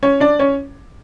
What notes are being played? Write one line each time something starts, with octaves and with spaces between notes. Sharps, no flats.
C#4 C#5
D4 D5
C#4 C#5